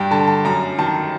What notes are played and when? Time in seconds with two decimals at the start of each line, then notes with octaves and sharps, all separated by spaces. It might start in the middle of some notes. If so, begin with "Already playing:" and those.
Already playing: G2 G5
0.11 D3 A5
0.27 A5
0.45 F#2 A#5
0.78 D#3 A5